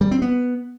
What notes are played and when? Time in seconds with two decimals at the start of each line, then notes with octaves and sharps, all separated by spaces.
0.01 G3
0.11 C4
0.22 B3